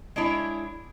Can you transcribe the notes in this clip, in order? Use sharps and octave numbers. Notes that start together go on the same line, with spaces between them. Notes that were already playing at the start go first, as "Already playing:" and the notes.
G#3 D4 E4 C#5